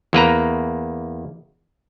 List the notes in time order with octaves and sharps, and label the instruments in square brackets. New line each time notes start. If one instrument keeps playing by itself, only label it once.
[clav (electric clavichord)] E2 A#3 B4 A#5